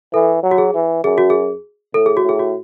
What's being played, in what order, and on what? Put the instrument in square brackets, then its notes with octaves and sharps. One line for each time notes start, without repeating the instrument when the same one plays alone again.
[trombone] E3 [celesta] A4
[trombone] F#3
[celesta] F#4
G#4
[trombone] E3
[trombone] F#2 [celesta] G#4
[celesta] F#4
G#4
[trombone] A2 [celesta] A4
[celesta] G#4
F#4
[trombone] A2 [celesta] G#4
[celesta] F#4